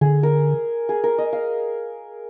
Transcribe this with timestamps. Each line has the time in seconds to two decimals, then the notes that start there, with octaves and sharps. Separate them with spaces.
0.01 D3 G#4
0.23 A#4
0.89 G#4
1.04 A#4
1.18 D#5
1.33 F5